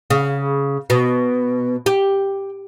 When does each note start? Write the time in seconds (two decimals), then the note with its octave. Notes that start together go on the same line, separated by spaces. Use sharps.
0.10 C#3
0.90 B2
1.86 G4